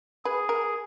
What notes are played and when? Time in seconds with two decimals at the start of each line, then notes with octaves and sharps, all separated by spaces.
0.25 G#4 B4
0.49 A#4